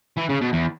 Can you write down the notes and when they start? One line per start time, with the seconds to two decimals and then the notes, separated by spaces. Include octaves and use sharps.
0.17 E3
0.29 C#3
0.41 B2
0.53 E2